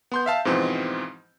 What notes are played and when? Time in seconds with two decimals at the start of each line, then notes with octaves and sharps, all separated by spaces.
0.12 B3 C6 G6
0.26 E5 F5 A5
0.45 G#2 B2 E3 F3 C4